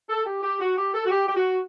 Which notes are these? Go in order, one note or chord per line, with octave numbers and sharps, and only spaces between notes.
A4
G4
G4
F#4
G4
A4
F#4
G4
G4
F#4